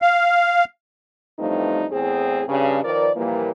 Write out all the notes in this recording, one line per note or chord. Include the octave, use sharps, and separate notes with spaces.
F5
G2 E3 F3 A3 C4 D#4
E2 A2 C4 G#4
G2 C#3
D#3 F3 A#4 B4 D5
A#2 E3 F3 G3 A#3